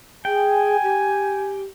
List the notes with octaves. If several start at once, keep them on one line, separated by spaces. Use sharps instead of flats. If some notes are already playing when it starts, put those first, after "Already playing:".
G#4 G5 G#5
G4